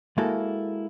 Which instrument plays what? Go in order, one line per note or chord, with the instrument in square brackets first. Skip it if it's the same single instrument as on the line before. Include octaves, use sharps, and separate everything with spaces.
[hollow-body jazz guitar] G#3 A#3 E4 F#4 A4